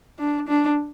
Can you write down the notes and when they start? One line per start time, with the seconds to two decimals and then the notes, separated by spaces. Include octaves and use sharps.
0.20 D4
0.48 D4